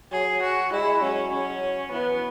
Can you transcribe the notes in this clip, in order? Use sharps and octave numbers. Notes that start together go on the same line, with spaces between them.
F#3 G#4
F#4
G#3 E4
F#3 C#4
C#4
E3 B3